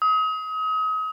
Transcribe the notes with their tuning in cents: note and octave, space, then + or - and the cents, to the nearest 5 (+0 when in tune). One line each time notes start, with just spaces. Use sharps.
D#6 +35